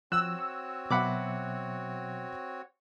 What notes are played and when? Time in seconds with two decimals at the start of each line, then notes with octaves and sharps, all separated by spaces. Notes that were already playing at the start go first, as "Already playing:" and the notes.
0.12 F3 C4 F#4 C#5 E6 F#6
0.39 C#6
0.90 B2 F#3 E5 F#5 B5 D6